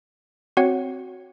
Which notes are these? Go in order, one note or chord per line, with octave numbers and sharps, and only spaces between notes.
C4 F#4 C#5 F#5